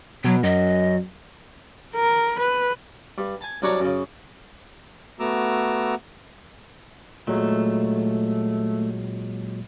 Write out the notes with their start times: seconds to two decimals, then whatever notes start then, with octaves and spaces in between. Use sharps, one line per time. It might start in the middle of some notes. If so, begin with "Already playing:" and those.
0.24 B2 F#3
0.43 F#2 D#5
1.96 A#4
2.39 B4
3.18 G2
3.41 G#5 A5
3.62 C2 F#3 D4 C#5 A5 A#5
3.80 F#2 C#3
5.20 A3 B3 F#4 A#5 D6 E6
7.27 A#2 F#3 G#3 A3